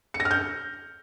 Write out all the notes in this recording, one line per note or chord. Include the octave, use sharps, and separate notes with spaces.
C#7
A#6
F6
G6